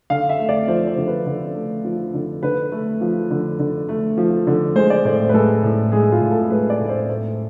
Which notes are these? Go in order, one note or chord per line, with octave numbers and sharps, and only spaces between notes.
D3 F5
E5
A3
D5
F3 C5
C5
D3
B4
D3
A3
F3
D3
D3 B4
A3
F3
D3
D3
A3
F3
D3
G#3 C5
D5
A2 C5
B4
G#3 A4
A2
G#3 G#4
F4
A2
A4
G#3 B4
D5
A2
C5
A3